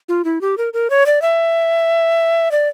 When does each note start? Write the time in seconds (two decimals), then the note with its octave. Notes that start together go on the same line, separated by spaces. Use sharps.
0.09 F4
0.25 E4
0.41 G4
0.58 A#4
0.73 A#4
0.90 C#5
1.06 D5
1.22 E5
2.51 D5